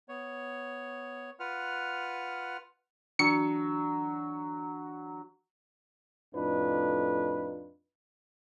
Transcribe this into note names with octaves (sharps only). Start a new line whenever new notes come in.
B3 C#5
F4 B4 F#5 F6
E3 F#3 D4 C#7
F2 A2 D4 D#4 F4 B4